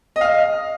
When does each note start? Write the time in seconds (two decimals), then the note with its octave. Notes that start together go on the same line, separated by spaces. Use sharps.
0.16 D#5
0.21 F5